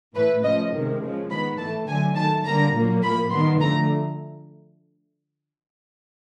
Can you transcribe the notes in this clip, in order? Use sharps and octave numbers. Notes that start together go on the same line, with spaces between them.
A2 E3 A3 B4
C#3 F3 A3 D#5
C3 D#3 G#3
C#3 F3 G#3
D#3 G#3 B3 B5
A2 E3 A3 A5
D3 F#3 A3 G#5
D#3 F#3 A3 A5
D3 G3 A#3 A#5
A#2 F#3 A#3
A2 F3 A#3 B5
D#3 G3 B3 C6
D3 F3 A3 A#5